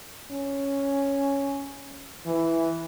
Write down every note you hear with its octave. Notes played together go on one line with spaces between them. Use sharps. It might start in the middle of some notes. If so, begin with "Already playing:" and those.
C#4
E3